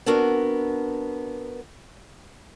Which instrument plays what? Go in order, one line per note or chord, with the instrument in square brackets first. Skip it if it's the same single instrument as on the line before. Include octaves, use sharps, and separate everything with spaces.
[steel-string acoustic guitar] B3 C4 D4 F#4 A#4